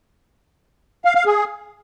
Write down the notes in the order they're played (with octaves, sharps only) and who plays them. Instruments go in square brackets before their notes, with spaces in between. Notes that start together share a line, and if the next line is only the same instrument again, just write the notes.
[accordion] F5
F5
G#4